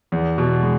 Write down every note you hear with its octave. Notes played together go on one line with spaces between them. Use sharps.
E2
B2
G#3